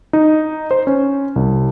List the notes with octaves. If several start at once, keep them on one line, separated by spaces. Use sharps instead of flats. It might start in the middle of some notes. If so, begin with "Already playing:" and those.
D#4
C5
C#4
C2